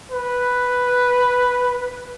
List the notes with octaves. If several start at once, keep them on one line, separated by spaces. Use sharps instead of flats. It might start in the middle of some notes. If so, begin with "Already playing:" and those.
B4